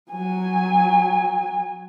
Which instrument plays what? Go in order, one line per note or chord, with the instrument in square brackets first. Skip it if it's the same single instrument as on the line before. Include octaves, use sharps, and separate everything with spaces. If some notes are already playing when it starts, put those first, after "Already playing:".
[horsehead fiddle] F#3 G#5